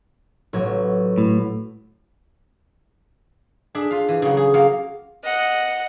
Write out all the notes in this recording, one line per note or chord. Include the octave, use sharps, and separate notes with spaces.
A1 F#3 G#6
A2
D4 G#4 E5
F4 F5
E3
C#3 F#3
G#4
F#3 A#3 F4 F5
D#5 F#5